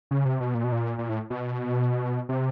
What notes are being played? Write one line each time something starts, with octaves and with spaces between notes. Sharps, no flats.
C#3
C3
B2
A#2
B2
A#2
A#2
A2
B2
C3